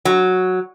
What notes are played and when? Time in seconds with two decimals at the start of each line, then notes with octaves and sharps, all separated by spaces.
0.05 F#3